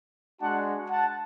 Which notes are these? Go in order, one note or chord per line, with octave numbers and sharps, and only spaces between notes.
G#3 D4 F#4 F#5 A5
F#5 A5